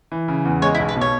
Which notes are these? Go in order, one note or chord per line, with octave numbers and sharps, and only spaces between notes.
E3
C#3
E2
G#3 C#5
E4
B1
B4
B2 C#5